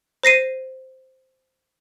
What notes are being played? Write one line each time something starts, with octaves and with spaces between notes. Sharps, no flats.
C5 A#6 C7 D#7